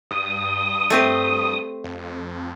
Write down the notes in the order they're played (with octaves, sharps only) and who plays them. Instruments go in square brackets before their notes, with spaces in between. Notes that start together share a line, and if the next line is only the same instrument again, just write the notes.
[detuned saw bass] G2 [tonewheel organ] D#6
[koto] A3 C4 G4
[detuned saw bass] F2